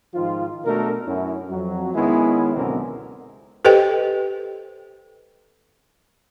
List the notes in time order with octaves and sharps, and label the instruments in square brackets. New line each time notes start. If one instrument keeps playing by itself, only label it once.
[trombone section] G#2 D#3 F3 F4
B2 A3 D4 F#4 A#4
F#2 C#4 E4
F2 F#3
D#3 G#3 B3 C#4 E4
C#2 F#2 B2 D3 C4 A#4
[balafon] G4 A4 B4 C5 D#5 G5